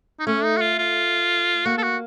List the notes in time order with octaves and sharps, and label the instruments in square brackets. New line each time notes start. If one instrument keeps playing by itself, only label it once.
[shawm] D#4
[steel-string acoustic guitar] A3 [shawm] C#4
[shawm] D#4
F#4
F4
F4
[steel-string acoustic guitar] A#3 [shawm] F#4
[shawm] A4
F#4